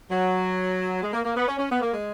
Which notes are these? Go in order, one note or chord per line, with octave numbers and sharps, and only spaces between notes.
F#3
G#3
A#3
A#3
B3
C#4
C#4
B3
A#3
G#3